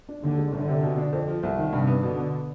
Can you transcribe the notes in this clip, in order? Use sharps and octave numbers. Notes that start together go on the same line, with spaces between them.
D4
D#2 D3
G#3
G1 D3
C3
B2
D4
F2
F3
C2
D#3
G2 C3
B3
B2 D3
B3